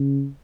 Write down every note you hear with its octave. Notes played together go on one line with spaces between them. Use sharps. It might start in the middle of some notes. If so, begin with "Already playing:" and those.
Already playing: C#3